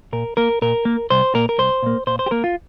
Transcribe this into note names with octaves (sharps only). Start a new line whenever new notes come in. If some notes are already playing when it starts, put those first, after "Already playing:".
A#2 A#4
A#3 A#4
A#2 A#4
A#3
C2 C5
A#2 A#3 A#4
A#4
C2 C5
A#2 A#3
A#2 C5
C5
G4
A#3 A#4
F4